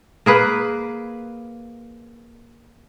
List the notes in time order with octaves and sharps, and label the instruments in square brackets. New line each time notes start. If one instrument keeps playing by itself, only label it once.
[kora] A#3 G#4 B4